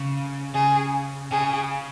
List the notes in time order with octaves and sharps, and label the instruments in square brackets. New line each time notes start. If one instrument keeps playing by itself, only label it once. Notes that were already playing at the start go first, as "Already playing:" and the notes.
Already playing: [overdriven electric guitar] C#3
[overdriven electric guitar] C#3 [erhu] G#4
[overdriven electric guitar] C#3 [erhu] G#4